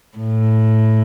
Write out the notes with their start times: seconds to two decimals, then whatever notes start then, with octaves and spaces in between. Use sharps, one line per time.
0.18 A2